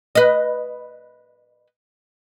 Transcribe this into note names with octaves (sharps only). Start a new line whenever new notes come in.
B4 D#5